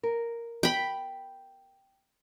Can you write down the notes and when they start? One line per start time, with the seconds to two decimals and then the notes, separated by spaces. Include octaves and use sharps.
0.03 A#4
0.63 G5 B5